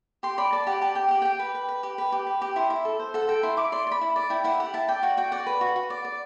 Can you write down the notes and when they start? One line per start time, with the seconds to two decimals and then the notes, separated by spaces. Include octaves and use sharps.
0.23 G4 C6
0.38 D5 B5
0.52 D5 A5
0.67 G4 F#5
0.81 G4 A5
0.95 G4 G5
1.08 G4 F#5
1.22 G4 G5
1.39 B4
1.54 B4
1.68 B4
1.83 G4
1.98 B4
2.12 G4
2.27 B4
2.42 G4
2.56 E4 C6
2.70 E4
2.85 A4
3.00 C5
3.14 A4 F#5
3.29 A4 G5
3.43 E4 C6
3.57 E4 D6
3.72 D5 C6
3.87 D5
3.91 B5
4.01 E4
4.16 D5
4.30 E4 G5
4.44 E4 F#5
4.60 G4 F#5
4.74 E4 A5
4.88 D5 G5
5.03 F#4 F#5
5.17 F#4 G5
5.32 D5 F#5
5.46 B4
5.61 F#4
5.76 F#4
5.90 D5
6.05 D5